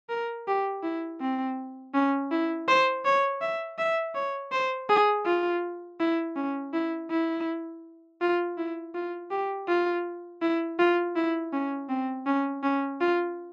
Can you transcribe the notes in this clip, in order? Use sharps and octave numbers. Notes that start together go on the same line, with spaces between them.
A#4
G4
E4
C4
C#4
E4
C5
C#5
E5
E5
C#5
C5
G#4
F4
E4
C#4
E4
E4
F4
E4
F4
G4
F4
E4
F4
E4
C#4
C4
C#4
C#4
F4